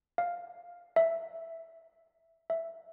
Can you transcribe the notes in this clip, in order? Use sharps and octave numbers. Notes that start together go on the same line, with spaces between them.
F5
E5
E5